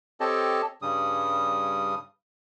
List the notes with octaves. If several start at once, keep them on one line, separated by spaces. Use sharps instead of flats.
C4 G4 A4 C#5 D#5 A5
G2 C#3 G3 D#6